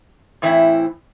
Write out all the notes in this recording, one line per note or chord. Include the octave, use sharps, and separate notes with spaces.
A2 E3 C4 E4